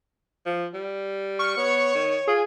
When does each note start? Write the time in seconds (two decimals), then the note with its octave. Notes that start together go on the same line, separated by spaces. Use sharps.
0.46 F3
0.74 G3
1.39 C#6 F6
1.56 B3 C#5
1.94 D#3
2.28 F4 G#4